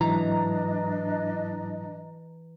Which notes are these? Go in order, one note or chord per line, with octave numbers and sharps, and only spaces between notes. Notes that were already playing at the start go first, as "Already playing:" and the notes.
G#2 E3 F#3 D4 E4 D#5 A#5